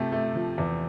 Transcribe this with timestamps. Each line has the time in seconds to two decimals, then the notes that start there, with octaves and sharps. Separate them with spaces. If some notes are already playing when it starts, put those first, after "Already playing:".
Already playing: C3 A3 G4 A4
0.12 A3
0.35 F3
0.58 E2